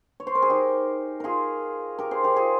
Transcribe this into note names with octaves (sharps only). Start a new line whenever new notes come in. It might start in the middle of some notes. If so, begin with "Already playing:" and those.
C#5
C5
A#4
G#4
D#4 G4
F4 G#4 A#4
G4 A#4
G#4 C5
G4 A#4
F4 G#4